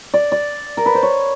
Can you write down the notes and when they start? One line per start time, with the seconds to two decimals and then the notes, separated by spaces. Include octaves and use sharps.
0.14 D5
0.32 D5
0.77 A#4
0.86 B4
0.95 C5
1.03 C#5